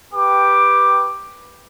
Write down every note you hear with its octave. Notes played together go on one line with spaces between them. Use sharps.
G4 B4 G5 D6